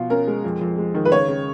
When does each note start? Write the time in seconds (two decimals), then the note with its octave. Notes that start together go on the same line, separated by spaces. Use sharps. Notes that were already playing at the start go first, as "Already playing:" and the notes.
Already playing: B2 F3 F4
0.10 C#4 A#4
0.27 G#3
0.44 F2
0.61 F2
0.78 G#3
0.95 D#3
1.05 B4
1.12 C#3 C#5
1.28 C#3